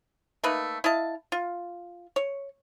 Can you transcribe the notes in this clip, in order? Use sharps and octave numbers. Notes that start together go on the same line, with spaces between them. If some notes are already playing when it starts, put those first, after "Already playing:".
A3 A#3 D#4 B4
E4 D#5 F5 A5
F4
C#5